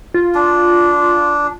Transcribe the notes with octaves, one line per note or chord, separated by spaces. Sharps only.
F4
D4